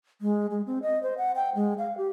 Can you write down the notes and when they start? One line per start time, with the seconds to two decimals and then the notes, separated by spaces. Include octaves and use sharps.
0.22 G#3
0.51 G#3
0.67 C4
0.82 D#5
1.03 C5
1.18 F#5
1.36 G5
1.55 G#3
1.78 F5
1.97 G4